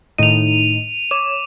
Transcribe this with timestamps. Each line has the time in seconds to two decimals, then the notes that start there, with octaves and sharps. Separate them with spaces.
0.18 A2 D#3 D#4 D#7 F7
1.11 C#5 D6